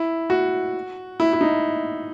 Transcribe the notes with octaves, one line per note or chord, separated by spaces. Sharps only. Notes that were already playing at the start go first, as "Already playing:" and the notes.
Already playing: E4
F#4
E4
E4
D#4